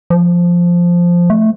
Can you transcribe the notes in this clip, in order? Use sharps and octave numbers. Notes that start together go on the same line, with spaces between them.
F3
A3